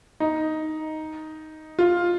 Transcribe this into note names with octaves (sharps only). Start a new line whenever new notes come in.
D#4
F4